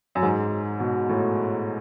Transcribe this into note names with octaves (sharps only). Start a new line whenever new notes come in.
F#2
G#2
B2
A2